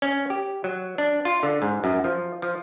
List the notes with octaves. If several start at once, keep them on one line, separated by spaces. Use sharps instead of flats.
C#4
G4
F#3
D4
F4
D3
G#2
F#2
F3
F3